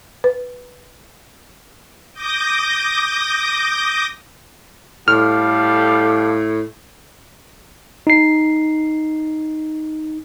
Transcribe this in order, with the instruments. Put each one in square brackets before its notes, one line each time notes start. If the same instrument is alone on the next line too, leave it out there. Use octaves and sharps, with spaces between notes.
[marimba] B4
[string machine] D6 D#6 G6 A#6
[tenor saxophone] A2 [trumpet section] G3 A4 F5 [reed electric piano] F6
[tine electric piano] D#4 C7